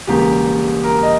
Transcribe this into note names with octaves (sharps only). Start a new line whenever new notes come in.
E1 E2 C#3 G3 A#3 G4
A#4
D#5